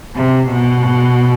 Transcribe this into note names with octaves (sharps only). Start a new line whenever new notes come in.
C3
B2